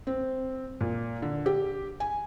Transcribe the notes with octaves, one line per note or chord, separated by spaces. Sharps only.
C4
A#2
D3
G4
G#5